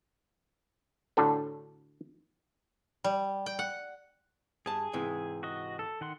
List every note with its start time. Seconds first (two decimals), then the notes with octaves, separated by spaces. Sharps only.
1.17 A2 D3 D4 F#4 A4
3.04 G3
3.46 G5
3.59 F#5
4.66 G2 G#4 A5
4.93 G#2 C3 E3
5.43 F#4 D#5
5.79 A4
6.01 D#3 F#5 C6